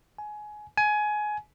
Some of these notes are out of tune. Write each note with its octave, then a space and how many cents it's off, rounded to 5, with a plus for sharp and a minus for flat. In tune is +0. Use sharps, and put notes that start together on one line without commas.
G#5 +20
G#5 +20